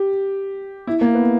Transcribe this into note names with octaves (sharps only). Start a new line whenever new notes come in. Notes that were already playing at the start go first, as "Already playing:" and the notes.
Already playing: G4
E4
A#3
B3